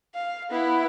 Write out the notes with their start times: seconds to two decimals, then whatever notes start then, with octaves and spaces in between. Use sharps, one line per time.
0.15 F5
0.50 B3 E4